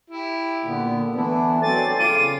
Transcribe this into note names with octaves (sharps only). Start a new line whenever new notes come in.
E4 G4
A#2 D3 B3
E3 A3 B3 D4 E4
F#3 C4 A4 C5 D5 G#5 A6
C#3 F4 D6 D#7